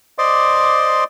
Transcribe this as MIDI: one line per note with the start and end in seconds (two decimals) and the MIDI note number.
0.18 1.04 72
0.18 1.04 74
0.18 1.04 75
0.18 1.04 84
0.18 1.04 86